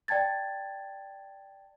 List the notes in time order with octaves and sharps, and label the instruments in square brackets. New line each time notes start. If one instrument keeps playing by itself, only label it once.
[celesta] D5 G5 A5 G#6 A6